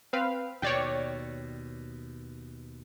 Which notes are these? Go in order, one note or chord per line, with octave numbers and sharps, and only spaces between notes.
C4 B4 F5
D#2 B2 C#5 D5 G5